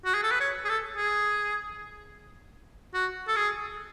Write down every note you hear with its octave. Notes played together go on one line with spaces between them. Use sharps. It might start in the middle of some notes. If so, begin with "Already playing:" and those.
F#4
G#4
A4
B4
C#5
G#4
A4
G#4
F#4
A4
G#4